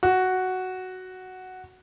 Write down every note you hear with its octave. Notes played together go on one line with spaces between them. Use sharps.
F#4